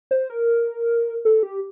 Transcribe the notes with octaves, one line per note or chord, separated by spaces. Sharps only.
C5
A#4
A4
G4